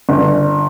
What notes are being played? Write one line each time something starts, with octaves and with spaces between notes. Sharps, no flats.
G1